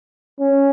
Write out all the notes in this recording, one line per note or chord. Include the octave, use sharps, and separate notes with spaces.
C#4